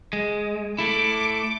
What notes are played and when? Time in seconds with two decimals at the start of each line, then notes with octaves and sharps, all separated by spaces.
0.13 G#3
0.79 A3 E4 D6